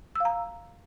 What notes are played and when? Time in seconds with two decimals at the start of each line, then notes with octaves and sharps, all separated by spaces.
0.15 E6
0.20 F5
0.25 A#5